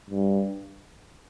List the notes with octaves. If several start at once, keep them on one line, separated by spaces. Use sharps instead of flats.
G2